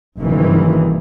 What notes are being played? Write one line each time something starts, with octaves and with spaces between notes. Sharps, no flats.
F#1 G2 C3 D#3 E3